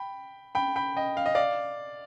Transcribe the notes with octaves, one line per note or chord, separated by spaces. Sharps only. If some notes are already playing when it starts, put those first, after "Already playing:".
Already playing: G5 B5
G5 B5
G5 B5
D#5 G5
F5
D#5
D5 F5